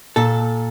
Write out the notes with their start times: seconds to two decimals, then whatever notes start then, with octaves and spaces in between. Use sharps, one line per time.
0.16 A#2 A4